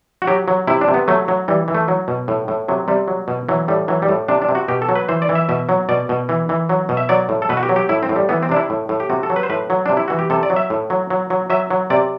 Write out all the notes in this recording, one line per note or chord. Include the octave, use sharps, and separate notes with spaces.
F#4
F#3 G4
F#3
C3 E4
D4
C3
B3
F#3 A3
F#3
E3 G3
E3
A3
F#3
B2
A2
A2
C3 F#3
C3 G3
F#3
B2
E3 F#3
A2 G3
E3 F#3
G3
A2
C3 D4
D4
C3
F#4
B2 G4
A4
F#3
B4
E3 C5
D5
E3
E5
B2 E5
F#3
B2 D5
B2
E3
E3
F#3
B2
E5
F#3 D5
A2
A4
B2 B4
F#4
G4
F#3
G4
A2 E4
C4
A2
G3
E3 B3
C4
C3 D4
E4
A2
A2
G4
C3 F#4
A4
F#3
B4
C5
A2 B4
F#3
C3 D4
E4
E3 F#4
G4
C3 A4
D5
F#3
E5
A2
F#3
F#3
F#3
F#3 E5
F#3
C3 D5